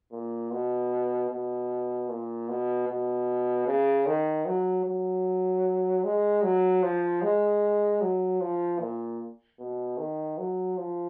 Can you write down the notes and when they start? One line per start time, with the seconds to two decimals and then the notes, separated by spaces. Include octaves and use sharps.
0.12 A#2
0.51 B2
1.30 B2
2.09 A#2
2.49 B2
2.88 B2
3.67 C#3
4.06 D#3
4.46 F#3
4.86 F#3
6.04 G#3
6.44 F#3
6.83 F3
7.22 G#3
8.01 F#3
8.41 F3
8.80 A#2
9.60 B2
9.98 D#3
10.38 F#3
10.78 F3